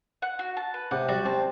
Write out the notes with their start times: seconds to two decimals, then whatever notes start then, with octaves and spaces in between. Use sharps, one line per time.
0.22 F#5
0.39 F#4
0.57 A5
0.74 B4
0.91 C3 F#5
1.08 G3 F#4
1.25 C4 A5